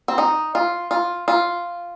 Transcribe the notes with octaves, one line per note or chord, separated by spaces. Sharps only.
C4
D#4
F4
F4
F4